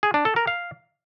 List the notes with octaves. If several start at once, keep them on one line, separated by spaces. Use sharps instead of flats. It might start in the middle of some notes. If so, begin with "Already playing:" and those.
G#4
D4
A4
A#4
F5